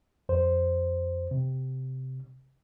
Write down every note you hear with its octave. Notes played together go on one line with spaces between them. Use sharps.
F2 C5
C3